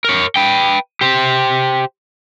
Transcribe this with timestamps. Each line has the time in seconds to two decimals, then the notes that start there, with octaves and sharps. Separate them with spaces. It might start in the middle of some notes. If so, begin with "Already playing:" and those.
0.05 A#4 C#5
0.36 B4 G5
1.01 G4 C5